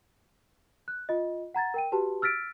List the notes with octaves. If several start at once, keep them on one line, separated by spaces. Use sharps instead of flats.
F#6
F4 D#5
F#5 A#5 G#6 A6
A#4 G5 D#7
F#4 G4 B4 A5
E6 F6 A6 B6 D7